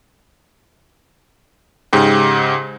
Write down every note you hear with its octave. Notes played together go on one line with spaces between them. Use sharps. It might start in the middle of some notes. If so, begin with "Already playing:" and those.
G#2 C#3 G4